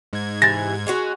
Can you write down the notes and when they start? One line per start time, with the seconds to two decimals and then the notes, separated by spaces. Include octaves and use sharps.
0.13 G#2 G#6
0.42 C3 E3 A6 A#6
0.87 G#3 C#4 F#4